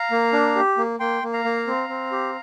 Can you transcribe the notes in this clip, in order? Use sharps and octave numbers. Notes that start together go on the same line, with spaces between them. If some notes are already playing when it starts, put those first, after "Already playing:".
Already playing: F5 A#5
A#3
D4
G4
A#3
A#3 G5 C6
A#3
F5 A#5
A#3
C4
C4
G4